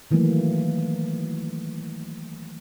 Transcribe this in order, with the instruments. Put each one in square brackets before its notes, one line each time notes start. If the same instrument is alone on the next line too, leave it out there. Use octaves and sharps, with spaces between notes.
[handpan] D#3 E3 F#3 A3 A#3